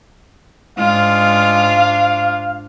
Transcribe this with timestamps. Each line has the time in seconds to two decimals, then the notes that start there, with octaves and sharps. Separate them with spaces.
0.79 G#2 G#3 D4 F4 F5